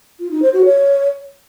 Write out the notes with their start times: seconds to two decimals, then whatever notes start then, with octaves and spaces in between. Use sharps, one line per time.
0.20 F4
0.31 D#4
0.42 C5
0.53 F#4
0.65 C#5